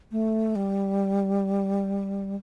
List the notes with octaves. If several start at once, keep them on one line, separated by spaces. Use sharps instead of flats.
A3
G3